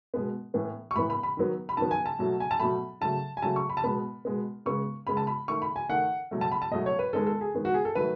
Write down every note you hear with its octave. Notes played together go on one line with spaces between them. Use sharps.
B2 G#3 B3
A2 E3 B3
C#6
A2 E3 B3 B5
B5
B5
D#3 F#3 B3
B5
D#3 F#3 B3 A5
G#5
A5
B2 F#3 A3
G#5
A5
B2 F#3 A3 B5
C#3 F#3 A3 A5
G#5
C#3 F#3 A3 A5
C#6
B5
A5
B2 G#3 B3 B5
B2 G#3 B3
C#3 G#3 B3 C#6
C#3 G#3 B3 B5
A5
B5
D#3 A3 C#6
B5
G#5
D#3 A3 F#5
B2 F#3 A3
A5
B5
A5
B2 F#3 A3 D#5
C#5
B4
D#3 G#3 B3 A4
A4
G#4
D#3 G#3 B3
F#4
G#4
A4
D#3 F#3 A3 B4